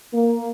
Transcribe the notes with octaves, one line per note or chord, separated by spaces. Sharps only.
A#3